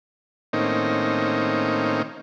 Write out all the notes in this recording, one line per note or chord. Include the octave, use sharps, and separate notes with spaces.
A2 D#3 A#3 C4 C#4 D#4